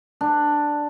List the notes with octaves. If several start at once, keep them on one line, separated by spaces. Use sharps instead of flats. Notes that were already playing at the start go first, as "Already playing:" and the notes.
D4